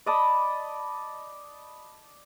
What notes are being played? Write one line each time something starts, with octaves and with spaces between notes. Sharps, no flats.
D5 D#5 A5 B5